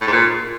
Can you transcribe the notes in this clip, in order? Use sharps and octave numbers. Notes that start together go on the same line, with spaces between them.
A2
G#2
A#2